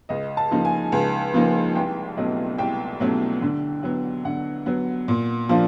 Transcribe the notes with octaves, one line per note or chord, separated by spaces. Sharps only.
C#2 D#5
A5
C#3 F3 A#3 D#4
G#5
C#2
C#3 F3 A#3 D#4
C2 G5
B2 F#3 A3 C#4 D#5
C2 G5
B2 F#3 A3 C#4
D3
F#3 B3
D3 F#5
F#3 B3
A#2
F3 A#3 D4 F4